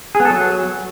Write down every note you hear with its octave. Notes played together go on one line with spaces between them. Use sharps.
G#4
B3
A4
F#3